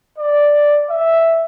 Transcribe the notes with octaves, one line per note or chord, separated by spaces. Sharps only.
D5
E5